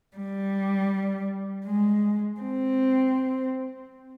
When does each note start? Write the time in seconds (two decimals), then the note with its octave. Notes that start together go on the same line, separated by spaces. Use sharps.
0.17 G3
1.66 G#3
2.41 C4